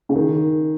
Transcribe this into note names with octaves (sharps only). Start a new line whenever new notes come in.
C#3
D#3